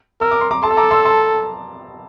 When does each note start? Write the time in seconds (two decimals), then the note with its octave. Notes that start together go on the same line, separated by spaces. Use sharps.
0.20 A#4 E6
0.31 D6
0.41 C6
0.51 A#5 D6
0.63 A4 A5 C6
0.71 E6
0.77 A#5 D6
0.91 C6 E6
1.05 A5 C6